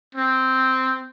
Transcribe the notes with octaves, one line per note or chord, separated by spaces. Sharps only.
C4